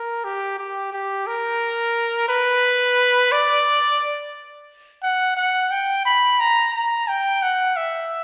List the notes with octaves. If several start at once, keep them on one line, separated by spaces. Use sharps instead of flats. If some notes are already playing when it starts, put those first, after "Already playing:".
Already playing: A#4
G4
G4
G4
A#4
B4
D5
F#5
F#5
G5
B5
A#5
A#5
G5
F#5
E5